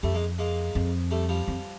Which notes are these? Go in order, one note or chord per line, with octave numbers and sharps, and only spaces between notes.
F2 G3 A3
G#3 A#3
G#3 A#3
F2
G3 A3
F3 G3
F2